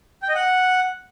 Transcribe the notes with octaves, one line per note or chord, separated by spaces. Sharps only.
G5
D#5
F#5